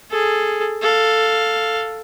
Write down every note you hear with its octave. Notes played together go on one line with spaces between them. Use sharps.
G#4 A4
A4 F5